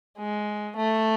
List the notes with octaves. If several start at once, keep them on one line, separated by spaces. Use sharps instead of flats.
G#3
A3